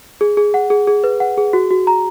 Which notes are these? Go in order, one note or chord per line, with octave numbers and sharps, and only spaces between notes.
G#4
G#4
F#5
G#4
G#4
B4
F#5
G#4
F#4
F#4
A#5